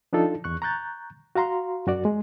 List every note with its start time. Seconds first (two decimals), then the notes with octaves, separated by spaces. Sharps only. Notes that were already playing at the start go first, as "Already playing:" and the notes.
0.13 F3 D4 D#4 F4 A4
0.44 E2 C#6 F#6
0.62 A#5 C#6 F#6 G6 A6
1.35 F#4 F5 A#5 C6
1.87 F#2 F#4 D5
2.05 G#3